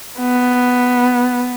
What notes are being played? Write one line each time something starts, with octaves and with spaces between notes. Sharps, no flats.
B3